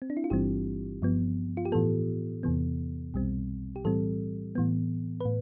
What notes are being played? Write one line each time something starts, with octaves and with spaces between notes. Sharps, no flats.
C4
D4
E4
F4
G1 G2 E3 G3 C4 G4
G2 F3 B3
F4
G4
A2 E3 B3 A4
E2 C3 E3 B3
B1 B2 G3 C4
G4
A2 E3 G3 C4 A4
A2 E3 B3
B4
A2